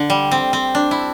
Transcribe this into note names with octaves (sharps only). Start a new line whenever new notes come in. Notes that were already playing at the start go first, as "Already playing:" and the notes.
Already playing: D3
G3
C4
C4
D4
E4